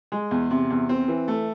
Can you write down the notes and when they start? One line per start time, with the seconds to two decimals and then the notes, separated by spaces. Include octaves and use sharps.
0.12 G#3
0.31 E2
0.50 C3
0.70 E2
0.89 C4
1.08 E3
1.28 A3